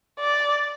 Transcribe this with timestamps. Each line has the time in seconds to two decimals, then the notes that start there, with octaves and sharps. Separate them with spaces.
0.20 D5